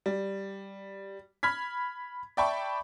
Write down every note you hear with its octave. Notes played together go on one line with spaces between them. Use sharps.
G3
B5 F6 G#6 B6
D5 E5 G5 A5 B5 C#6